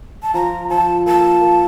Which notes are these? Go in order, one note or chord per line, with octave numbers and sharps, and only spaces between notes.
A5
F3 A#5
F3 A5
A#3 A5
A#3